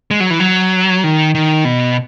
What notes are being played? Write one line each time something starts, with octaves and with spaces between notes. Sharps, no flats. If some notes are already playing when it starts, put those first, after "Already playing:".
G#3
F#3
E3
F#3
D#3
D#3
B2